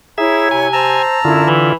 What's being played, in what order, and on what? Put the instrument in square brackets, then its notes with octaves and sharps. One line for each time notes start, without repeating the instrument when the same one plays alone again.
[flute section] E4 C#5 A#5 [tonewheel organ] G#4 E5
[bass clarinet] C3 [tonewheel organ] G#5
[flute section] C5 [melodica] A5 A#5 E6
[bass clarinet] F#2 [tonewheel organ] D3 F4 [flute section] E4
[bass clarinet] E3